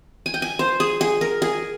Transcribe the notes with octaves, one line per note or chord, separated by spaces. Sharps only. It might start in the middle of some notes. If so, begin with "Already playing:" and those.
G#5
G5
G#5
C5
G#4
G#4
A#4
G#4